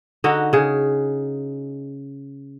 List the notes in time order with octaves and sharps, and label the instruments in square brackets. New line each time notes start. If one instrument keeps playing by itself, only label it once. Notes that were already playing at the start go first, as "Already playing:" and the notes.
[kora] D3 D#4 F#4
C#3 G#4